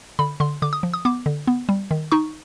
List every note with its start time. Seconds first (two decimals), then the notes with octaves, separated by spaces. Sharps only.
0.19 D3 B5
0.40 D3 C6
0.62 D3 D6
0.73 D#6
0.83 F3
0.94 D#6
1.05 B3 D6
1.26 D3
1.47 B3
1.69 G3
1.91 D#3
2.12 D#4 C#6